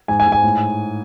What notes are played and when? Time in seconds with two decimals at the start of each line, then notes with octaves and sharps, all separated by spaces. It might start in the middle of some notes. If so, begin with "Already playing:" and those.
0.08 G#2 G#5
0.20 G#5
0.26 G#2
0.32 G#5
0.43 A2